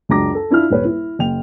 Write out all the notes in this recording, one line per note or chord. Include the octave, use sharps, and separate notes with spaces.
C#2 F#2 D4 A#5 D6 A#6
A4
D4 E4 F4 F6
D#1 B4 C#5
E4
F#1 G5 F7